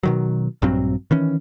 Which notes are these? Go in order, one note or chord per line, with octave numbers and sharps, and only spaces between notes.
B2 D#3 F#3
A#1 G2 F#3 C4
D#3 E3 C#4